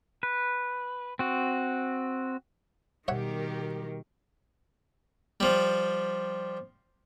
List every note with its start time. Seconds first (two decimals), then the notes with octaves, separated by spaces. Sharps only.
0.23 B4
1.19 C4 F#4
3.08 B2 D#3 G3 G4 A#4 C#5 E5 F#5
5.40 F3 G3